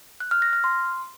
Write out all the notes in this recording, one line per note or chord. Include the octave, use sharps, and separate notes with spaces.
F#6
F6
A#6
F6
C6